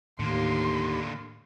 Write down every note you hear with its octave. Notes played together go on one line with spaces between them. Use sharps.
D#2 A2 D3 D#3 A#3 C6